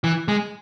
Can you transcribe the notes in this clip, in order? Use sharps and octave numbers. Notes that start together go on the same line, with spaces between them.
E3
G#3